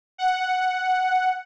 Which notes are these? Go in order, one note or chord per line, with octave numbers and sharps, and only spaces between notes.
F#5